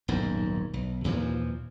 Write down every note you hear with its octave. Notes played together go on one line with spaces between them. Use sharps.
D#1 B1 G#2
B1
D#2 A#2 E3 F3